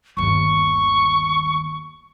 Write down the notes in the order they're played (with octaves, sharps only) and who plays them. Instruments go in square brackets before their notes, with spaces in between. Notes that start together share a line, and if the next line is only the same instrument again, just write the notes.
[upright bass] G1 D#2 [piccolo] C#6